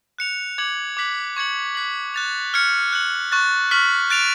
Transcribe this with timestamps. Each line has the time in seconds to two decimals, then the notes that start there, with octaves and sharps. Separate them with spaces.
0.19 F#6 C#7 F7
0.58 D6 G#6 C#7 F#7
0.97 D6 F#6 B6 F#7
1.36 C#6 G#6 C#7 F#7
1.75 F#6 B6 F#7
2.14 F#6 A6 F7
2.54 F6 G#6 C#7
2.93 F#6 C#7 F#7
3.32 C#6 F#6 A6
3.71 C#6 F6 B6 F#7
4.10 F#6 A6 D7 F7